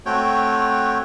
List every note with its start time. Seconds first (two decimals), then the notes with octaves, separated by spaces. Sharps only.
0.06 A3 C4 F#4 C#5 G5